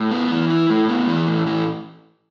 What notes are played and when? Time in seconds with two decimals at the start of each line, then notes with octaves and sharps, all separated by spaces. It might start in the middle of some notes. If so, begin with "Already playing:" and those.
Already playing: A2
0.11 B3
0.31 E3
0.50 E4
0.70 A2
0.89 B3
1.07 E3
1.27 A2
1.47 E3